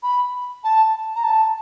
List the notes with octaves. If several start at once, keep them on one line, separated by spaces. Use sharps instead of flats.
B5
A5
A#5
A5